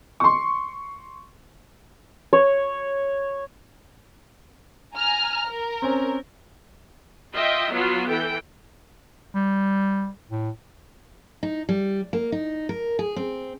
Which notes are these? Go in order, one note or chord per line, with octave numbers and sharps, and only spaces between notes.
C6 C#6
C#5
G#5 A#5 F6
A#4
C4 C#4
F4 D#5 E5 G5
F#3 B3 F4 F#4
E3 A4 G5
G3
A2
D#4
G3
A#3
D#4
A#4
G#4
C4